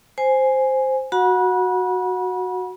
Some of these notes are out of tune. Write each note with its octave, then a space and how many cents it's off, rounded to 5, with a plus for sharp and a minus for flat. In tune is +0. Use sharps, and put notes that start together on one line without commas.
C5 +0 G#5 +0
F#4 -5 F#5 -25 B5 -35